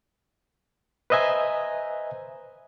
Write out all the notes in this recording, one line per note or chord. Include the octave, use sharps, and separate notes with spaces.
B4 C5 D#5 E5 G#5 A#5